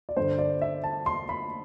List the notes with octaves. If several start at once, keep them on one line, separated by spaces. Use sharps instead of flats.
D5
G2 D3 C5
D5
E5
A5
C6
B5